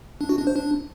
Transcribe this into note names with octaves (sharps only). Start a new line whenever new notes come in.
D4
F#4
D4
C5
D4